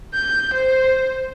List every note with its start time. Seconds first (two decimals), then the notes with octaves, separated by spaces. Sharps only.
0.14 G6
0.53 C5